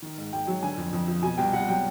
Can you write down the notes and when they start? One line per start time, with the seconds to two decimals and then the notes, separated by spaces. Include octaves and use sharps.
0.02 D#3
0.18 G#2
0.32 G#2 G5
0.47 F#3
0.63 D3 G#5
0.77 F2
0.93 F2
1.07 F3
1.22 B2 G#5
1.38 C2 G5
1.53 C2 F#5
1.68 F#3 G5